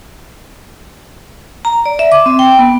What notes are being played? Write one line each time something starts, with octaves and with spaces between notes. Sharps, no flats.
A#5
D5
E5
D6
C4
G5
B3